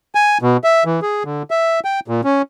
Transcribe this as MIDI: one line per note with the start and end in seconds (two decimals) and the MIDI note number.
0.15 0.38 80
0.42 0.57 47
0.64 0.84 76
0.85 1.00 52
1.02 1.23 68
1.25 1.43 50
1.51 1.80 76
1.85 2.00 79
2.08 2.21 46
2.24 2.42 61